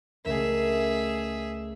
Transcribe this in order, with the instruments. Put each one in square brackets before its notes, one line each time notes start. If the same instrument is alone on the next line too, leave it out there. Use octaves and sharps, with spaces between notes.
[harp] C#2 A3 A#4 [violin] G#4 E5